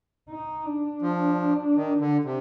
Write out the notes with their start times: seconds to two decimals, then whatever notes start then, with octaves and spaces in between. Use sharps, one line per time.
0.29 D#4
0.66 D4
1.02 F3
1.76 D#3
2.00 D3
2.24 C3